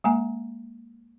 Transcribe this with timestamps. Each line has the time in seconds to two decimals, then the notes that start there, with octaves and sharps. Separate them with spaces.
0.04 G#3 A#3 G#5 A#5